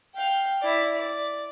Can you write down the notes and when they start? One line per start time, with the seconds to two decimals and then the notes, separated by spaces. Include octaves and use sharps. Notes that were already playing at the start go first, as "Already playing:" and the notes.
0.14 F5 G5
0.62 E4 D5
0.95 D5